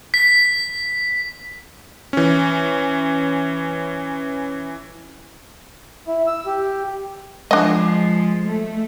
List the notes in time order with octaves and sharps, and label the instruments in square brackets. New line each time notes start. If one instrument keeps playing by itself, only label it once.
[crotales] B6
[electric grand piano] E3 C#4
[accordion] E4
E6
G4
[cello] F3 [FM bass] G#3 [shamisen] D4 D#5
[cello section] A3